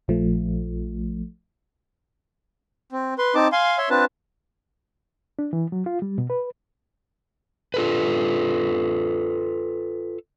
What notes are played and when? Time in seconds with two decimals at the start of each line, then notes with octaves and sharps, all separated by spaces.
0.08 A#1 F3 A3
2.92 C4
3.18 B4 C6
3.35 C4 D#4 A5 D6
3.52 F5 G#5 C6
3.78 C#5 E5 C6
3.90 C4 D4 F4 B4 A5
5.39 D4
5.53 E3
5.72 F#3
5.86 F4
6.02 G3
6.18 B2
6.30 B4
7.74 F4 A4 B4